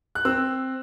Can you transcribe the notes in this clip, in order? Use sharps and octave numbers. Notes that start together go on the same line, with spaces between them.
F#6
C4 E6